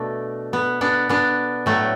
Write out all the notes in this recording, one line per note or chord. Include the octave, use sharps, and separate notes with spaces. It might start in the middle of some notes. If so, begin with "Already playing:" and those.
Already playing: B2 A3 D4
B3
B3 D4
B3 D4
A2 F#3 A3